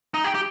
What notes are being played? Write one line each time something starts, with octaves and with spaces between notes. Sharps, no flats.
D#4
G4
G4